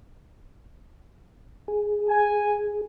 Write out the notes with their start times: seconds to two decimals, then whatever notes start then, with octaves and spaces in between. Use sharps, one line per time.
1.68 G#4
2.09 G#5